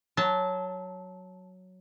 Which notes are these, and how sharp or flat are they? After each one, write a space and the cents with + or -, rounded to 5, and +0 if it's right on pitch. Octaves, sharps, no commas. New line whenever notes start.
F#3 +0 A5 -10